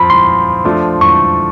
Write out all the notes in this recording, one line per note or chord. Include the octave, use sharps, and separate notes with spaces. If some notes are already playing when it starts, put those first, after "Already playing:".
Already playing: F3 C4 F4 B5
C6
F3 A3 D4 F4
C#6